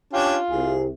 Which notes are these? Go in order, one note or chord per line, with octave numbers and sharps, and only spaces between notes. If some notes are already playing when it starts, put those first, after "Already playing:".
C#4 D4 F4 G4
C2 C3 G#4